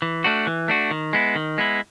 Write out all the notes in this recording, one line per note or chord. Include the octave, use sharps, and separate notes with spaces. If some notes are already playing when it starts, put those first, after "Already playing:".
E3
A3 D4 F#4
E3
A3 D4 F#4
D#3
G#3 B3 E4
D#3
G#3 B3 E4